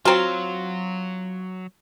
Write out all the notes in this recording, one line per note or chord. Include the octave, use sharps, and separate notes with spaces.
F#3 C4 F4 F#4 A#5 C6